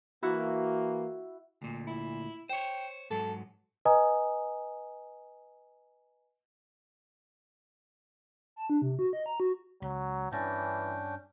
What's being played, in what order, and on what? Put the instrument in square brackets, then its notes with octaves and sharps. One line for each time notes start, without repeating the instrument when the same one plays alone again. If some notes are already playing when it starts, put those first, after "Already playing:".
[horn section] E3 A#3 [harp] E4 F#4
[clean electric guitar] D2 A#2
[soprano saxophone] E4
[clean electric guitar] C5 C#5 [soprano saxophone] G5
[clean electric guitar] G#2 F#3 [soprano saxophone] A4
[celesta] B4 D#5 G#5 A#5 D#6
[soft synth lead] A5
D4
C3
F#4
D#5
A#5
F#4
[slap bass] C#2 [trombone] F#3
[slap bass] G2 [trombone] E3 [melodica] C#4 D4 G5